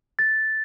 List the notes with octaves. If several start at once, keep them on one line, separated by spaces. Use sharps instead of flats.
A6